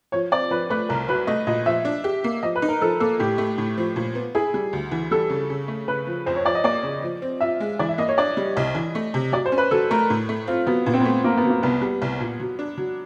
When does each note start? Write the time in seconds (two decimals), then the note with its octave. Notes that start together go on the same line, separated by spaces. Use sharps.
0.12 F3 C#5
0.32 C4 D5
0.51 F3 B4
0.70 A3 B4
0.89 C2 A#4
1.08 F#3 B4
1.27 A3 D#5
1.47 A#2 D#5
1.66 F3 E5
1.85 D4
2.04 G4
2.24 A#3
2.43 F3 D#5
2.56 B4
2.62 D#4
2.69 A#4
2.81 F3 A4
3.00 A#3 A4
3.19 A2 G4
3.38 A3
3.58 A2
3.78 F3
3.96 A#2
4.15 B3
4.35 E4 G#4
4.54 G3
4.73 D2
4.91 E3
5.11 G3 A4
5.30 C#3
5.50 C#3
5.68 A3
5.88 C#3 B4
6.07 F3
6.26 F2 C5
6.36 C#5
6.45 F3 D5
6.55 D#5
6.64 A#3 D5
6.83 C#3
7.03 F3
7.22 C4
7.41 F4 E5
7.60 G#3
7.79 E3 D5
7.89 E5
7.98 A#3 D#5
8.08 C#5
8.18 D4 D5
8.37 G3
8.56 C2 D#5
8.75 E3
8.95 A3
9.14 C3
9.32 F#3 D5
9.46 C5
9.52 C#4
9.58 B4
9.71 F#3 A4
9.91 A3 A#4
10.10 A2
10.29 A3
10.47 C4 F4
10.66 F#3 B3
10.86 A#2 B3
10.93 C4
11.00 B3
11.05 A3
11.24 A#3 C4
11.37 B3
11.44 F#3
11.50 A#3
11.63 C2 B3
11.81 G3
12.02 C2
12.20 A#2
12.40 F#3
12.59 D4
12.78 F#3